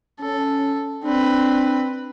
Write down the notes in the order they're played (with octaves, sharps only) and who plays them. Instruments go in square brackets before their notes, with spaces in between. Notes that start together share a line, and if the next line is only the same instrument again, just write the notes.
[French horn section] C#4 [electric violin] A4
[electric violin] C4 B4 [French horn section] D4